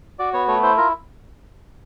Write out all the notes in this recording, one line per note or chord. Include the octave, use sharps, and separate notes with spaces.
F#4 D5
B3 C#5
A3 C#5
E4 C5
F4 A#4